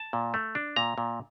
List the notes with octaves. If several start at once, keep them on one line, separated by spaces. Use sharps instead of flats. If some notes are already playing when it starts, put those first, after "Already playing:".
Already playing: A5
A#2
A3
D4
A#2 A#5
A#2